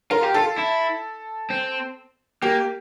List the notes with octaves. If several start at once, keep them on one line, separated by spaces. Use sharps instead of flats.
F4 A#4
G4
F4 A4
E4
C4
A#3 G4